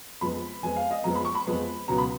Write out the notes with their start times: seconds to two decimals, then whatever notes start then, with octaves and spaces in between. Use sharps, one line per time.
0.21 F2 F3 G#3 B3 B5
0.63 F2 F3 G#3 B3 G#5
0.76 F5
0.91 D#5
1.04 F2 F3 G#3 B3 A#5
1.15 B5
1.25 C#6
1.35 B5
1.47 F2 F3 G#3 B3
1.88 C#2 B2 F#3 A#5
1.98 B5